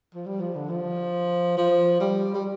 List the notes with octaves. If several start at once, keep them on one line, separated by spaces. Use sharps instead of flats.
F3
G3
F3
D3
F3
F3
G3
G3